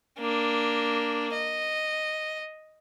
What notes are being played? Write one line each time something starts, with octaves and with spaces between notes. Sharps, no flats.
A#3 D4
D#5